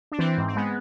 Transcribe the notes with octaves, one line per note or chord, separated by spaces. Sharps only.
D4
E3 C4
G#2
C4
G#3 B3